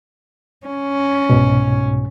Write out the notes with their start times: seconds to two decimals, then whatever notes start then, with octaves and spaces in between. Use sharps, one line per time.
0.66 C#4
1.29 C2 G#2 B2